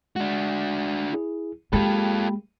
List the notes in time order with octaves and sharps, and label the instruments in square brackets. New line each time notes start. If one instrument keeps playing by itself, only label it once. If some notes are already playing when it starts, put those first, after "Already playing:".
[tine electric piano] G#3 [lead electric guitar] D4 F#4
[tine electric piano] E4 G#4
[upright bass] G#3 A#3 [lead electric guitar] F4 A4 [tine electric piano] G4 G5 B5